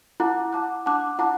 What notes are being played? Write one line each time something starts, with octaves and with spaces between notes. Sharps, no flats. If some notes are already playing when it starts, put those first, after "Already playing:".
E4 F#5 A5 D6 F#6
F#5 A5 D6 F#6
D4 F#5 A5 D6 F#6
E4 F#5 A5 D6 F#6